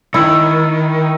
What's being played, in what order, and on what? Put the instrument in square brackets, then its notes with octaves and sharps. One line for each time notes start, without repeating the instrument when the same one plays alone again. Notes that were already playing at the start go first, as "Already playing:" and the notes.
[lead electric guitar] D#3 [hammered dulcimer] E4